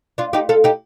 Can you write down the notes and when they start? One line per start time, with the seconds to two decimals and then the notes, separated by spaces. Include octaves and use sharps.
0.18 D4 F4
0.33 D#4 G4
0.49 F4 A4
0.64 D#4 G4